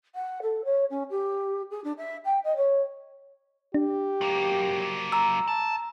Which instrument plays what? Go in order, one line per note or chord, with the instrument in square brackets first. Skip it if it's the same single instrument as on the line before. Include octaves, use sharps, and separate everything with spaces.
[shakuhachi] F#5
A4
C#5
C#4
G4
G#4
D4
E5
G5
D#5
C#5
[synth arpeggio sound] D4 [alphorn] G4
[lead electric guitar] F#3 A#3
[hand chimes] A#5 E6
[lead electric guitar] A5